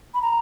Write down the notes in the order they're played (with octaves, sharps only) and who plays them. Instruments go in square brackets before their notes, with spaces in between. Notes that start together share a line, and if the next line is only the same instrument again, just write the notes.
[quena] B5
A#5